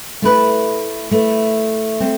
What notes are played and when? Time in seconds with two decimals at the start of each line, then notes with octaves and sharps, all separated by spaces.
0.22 A3 E4 B4
1.11 A3 E4 B4
2.00 A3 C4